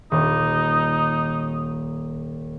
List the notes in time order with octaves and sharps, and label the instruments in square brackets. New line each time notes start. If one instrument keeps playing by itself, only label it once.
[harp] D#1 [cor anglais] D#4